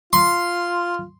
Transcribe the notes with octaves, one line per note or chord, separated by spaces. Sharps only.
F4 C6